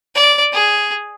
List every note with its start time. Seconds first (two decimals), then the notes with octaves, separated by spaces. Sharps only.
0.15 D5
0.53 G#4